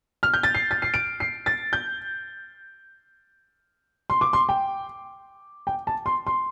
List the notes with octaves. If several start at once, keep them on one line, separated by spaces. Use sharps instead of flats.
F6
G6
A6
C7
A6
C7
D7
C7
A6
G6
C6
D6
C6
G5
G5
A5
C6
C6